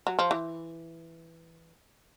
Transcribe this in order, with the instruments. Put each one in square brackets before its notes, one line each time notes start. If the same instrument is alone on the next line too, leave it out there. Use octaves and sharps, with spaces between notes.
[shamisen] F#3
F3
E3